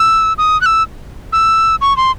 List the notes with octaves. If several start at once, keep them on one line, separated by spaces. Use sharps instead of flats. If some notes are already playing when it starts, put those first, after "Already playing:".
Already playing: E6
D#6
F#6
E6
E6
C#6
C6